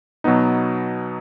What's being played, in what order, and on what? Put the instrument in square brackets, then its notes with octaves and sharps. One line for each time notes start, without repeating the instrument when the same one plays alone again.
[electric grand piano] B2 F#3 B3 D#4